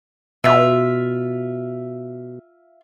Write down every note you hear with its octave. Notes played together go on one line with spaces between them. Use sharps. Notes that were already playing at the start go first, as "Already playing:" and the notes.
B2 F4 E5